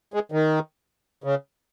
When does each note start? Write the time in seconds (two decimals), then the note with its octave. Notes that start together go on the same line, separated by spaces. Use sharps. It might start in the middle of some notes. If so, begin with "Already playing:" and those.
0.14 G#3
0.32 D#3
1.24 C#3